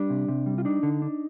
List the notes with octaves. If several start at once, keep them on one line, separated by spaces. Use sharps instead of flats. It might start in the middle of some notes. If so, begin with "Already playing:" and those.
Already playing: G3 D4
C3
C3
G3
F4
D4 D#4
D3
D4